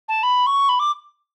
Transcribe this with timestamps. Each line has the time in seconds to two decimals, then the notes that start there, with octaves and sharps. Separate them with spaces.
0.08 A5
0.23 B5
0.46 C#6
0.69 B5
0.79 D6